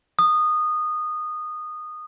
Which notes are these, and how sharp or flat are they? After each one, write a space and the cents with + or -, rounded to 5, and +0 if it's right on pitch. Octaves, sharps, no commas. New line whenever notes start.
D#6 -20